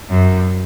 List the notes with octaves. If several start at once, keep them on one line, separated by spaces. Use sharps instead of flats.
F#2